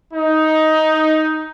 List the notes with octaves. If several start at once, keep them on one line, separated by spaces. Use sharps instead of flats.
D#4